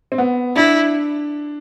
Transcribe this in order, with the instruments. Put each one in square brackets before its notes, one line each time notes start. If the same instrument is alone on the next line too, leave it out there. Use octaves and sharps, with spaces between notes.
[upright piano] C4
B3
[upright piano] D4 [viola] E4